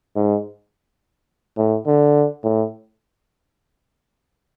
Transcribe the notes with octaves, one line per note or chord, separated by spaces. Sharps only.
G#2
A2
D3
A2